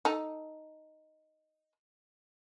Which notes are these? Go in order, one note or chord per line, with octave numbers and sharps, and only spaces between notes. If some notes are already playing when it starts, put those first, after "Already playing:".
D#4 A4